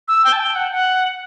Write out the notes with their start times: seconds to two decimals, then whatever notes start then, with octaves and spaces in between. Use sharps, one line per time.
0.08 E6
0.24 G5
0.33 A5
0.40 G5
0.55 F#5
0.72 F#5